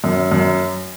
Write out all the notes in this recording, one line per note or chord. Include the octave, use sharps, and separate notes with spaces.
F#2
F#2